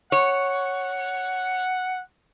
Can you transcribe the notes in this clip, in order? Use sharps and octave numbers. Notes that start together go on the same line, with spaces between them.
C#5 F#5